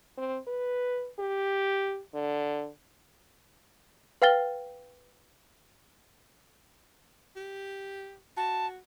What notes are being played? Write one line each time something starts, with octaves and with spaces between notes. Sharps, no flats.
C4
B4
G4
D3
B4 F5 G5 F6 A6 G7
G4
F#4 A5